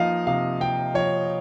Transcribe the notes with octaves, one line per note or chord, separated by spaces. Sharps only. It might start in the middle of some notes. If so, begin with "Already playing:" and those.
Already playing: F3 A#3 D#4 D#5 F5
C3 F5
C3 G5
F3 C#5